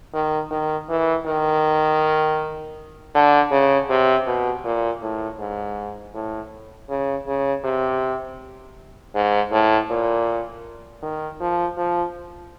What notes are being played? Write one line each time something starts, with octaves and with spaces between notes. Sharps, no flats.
D#3
D#3
E3
D#3
D3
C#3
C3
B2
A#2
A2
G#2
A2
C#3
C#3
C3
G#2
A2
A#2
D#3
F3
F3